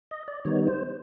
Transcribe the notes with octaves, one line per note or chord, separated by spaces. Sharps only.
D#5
D5
D#3 G3 B3 D#4 C#5
C5